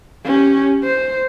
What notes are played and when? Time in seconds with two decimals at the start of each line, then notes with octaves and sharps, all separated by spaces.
0.25 C#4 G4
0.84 C5